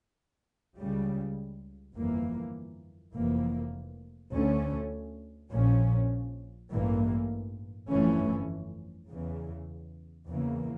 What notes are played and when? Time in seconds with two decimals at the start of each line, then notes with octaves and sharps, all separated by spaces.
0.77 C#2 C#3 G3
1.95 G1 F2 E3 A#3
3.14 F1 F2 E3 A#3
4.33 D2 D3 A3 C#4
5.52 A#1 A#2 F3 C#4
6.71 A1 G2 E3 A#3
7.89 G1 F2 E3 A3 C#4
9.09 E2 C#3 E3
10.27 E2 C#3 E3 A#3